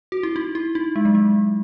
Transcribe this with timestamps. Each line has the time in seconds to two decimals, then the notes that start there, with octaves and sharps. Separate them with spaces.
0.12 F#4
0.23 E4
0.36 D#4
0.55 E4
0.75 D#4
0.96 G#3
1.05 F#3
1.15 G#3